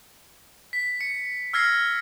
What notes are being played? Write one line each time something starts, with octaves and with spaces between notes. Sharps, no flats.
B6
C#7
E6 F6 G#6 A#6 C7